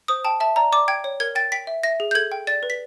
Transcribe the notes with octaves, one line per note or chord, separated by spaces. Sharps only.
C5 D#6
G5 A5
E5 A5
D5 A#5
D5 D6
G5 G#6
C#5
A#4 G#6
G5 A6
G5 B6
E5
E5 A#6
G#4
G6
A4 G#6
G5
D5 A6
B4
B6